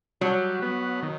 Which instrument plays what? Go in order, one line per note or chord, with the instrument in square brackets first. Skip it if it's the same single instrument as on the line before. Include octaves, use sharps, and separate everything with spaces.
[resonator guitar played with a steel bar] F#3 [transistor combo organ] G3
[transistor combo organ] B3
D#3